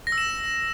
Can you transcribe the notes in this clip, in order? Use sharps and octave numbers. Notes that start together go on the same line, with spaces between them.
A#6
E6
E7